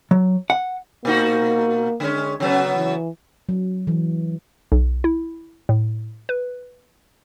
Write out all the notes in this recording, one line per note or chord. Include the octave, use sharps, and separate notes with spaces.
F#3
F#5
B2 A#3 D#4 F#4
D3 G#3 C#4
C#3 F#3 B3 C#4
E3
F#3
E3
B1
E4
A2
B4